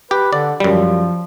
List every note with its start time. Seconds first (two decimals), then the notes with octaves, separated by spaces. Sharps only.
0.11 G4 B4
0.33 D3 D5
0.60 F#2 F3 G3